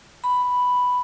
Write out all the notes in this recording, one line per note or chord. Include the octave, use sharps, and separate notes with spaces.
B5